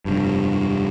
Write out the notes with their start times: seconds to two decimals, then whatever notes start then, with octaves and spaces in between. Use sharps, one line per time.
0.05 F1 G2